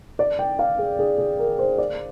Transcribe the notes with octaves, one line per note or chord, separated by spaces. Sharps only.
D5
G5
F5
G#4
G#4
G#4
A#4
C5
D5